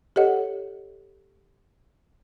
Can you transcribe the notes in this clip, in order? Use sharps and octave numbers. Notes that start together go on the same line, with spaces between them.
G4 A4 C#5 D#5 F#5